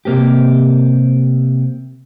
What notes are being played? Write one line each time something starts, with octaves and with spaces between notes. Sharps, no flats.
C3 A#3 C4 G4